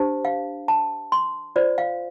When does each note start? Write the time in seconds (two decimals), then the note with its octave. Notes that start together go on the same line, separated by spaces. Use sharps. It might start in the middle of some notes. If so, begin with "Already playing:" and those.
Already playing: D4 G4 C5 A5
0.25 F5
0.68 A5
1.12 C6
1.56 F4 C5 D5
1.78 F5